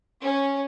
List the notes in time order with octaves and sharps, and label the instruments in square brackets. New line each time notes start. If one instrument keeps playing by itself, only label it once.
[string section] C#4